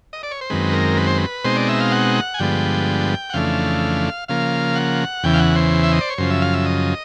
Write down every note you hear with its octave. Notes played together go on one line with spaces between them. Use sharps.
D#5
D5
C#5
C5
F#2 D#3 G#3 C4 B4
A#4
B4
C5
B4
B2 G#3 C4 D#4 C5
D5
E5
F5
F#5
G#5
G2 D3 F3 G#3 B3 G5
F#5
F2 C#3 E3 A3 D4 F5
C#3 F3 A#3 F5
F#5
E2 C#3 E3 G5
F5
F#5
C5
E5
D#5
D5
C#5
F#2 C#3 F3 C5
E5
F5
E5
D#5